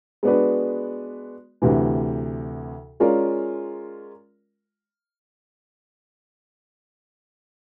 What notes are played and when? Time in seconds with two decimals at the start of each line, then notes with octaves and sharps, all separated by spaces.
0.23 G#3 B3 D4 F#4 B4
1.62 D2 C3 E3
3.00 G#3 C#4 F4 A#4 D5